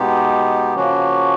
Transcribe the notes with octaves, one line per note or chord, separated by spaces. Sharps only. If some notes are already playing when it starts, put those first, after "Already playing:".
Already playing: B2 G#3 B3 D#4 G4
C#3 F3 A#3 C#4 F#4